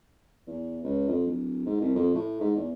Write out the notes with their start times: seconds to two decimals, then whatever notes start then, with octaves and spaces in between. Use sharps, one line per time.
0.47 E2
0.84 C#2
1.09 F2
1.27 D1
1.66 G#2
1.81 C2
1.96 F2
2.15 A2
2.40 G#2
2.56 E2